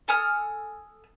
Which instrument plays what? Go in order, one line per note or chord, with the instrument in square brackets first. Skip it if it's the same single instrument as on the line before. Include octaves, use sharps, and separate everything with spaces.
[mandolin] A4 G#5 D#6 F6